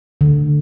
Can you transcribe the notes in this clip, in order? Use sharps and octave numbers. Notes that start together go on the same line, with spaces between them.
D3